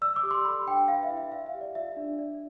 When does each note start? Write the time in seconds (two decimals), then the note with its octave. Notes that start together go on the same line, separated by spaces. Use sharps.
0.02 D5 E6
0.16 D6
0.23 G4
0.31 C6
0.45 A4 B5
0.67 D4 G5
0.88 B4 F5
1.03 E5
1.10 E4
1.17 E5
1.32 D5 F5
1.46 E5
1.54 G4
1.61 D5
1.75 F4 E5
1.97 D4
2.19 D5